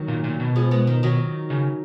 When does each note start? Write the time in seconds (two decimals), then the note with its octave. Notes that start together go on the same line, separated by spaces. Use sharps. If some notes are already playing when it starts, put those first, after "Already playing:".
Already playing: D#3 F#3
0.08 A#2
0.24 A#2
0.40 B2
0.56 F3 G#3
0.71 G#3 B3
0.87 D#3
1.03 D#3 F#3
1.50 C#3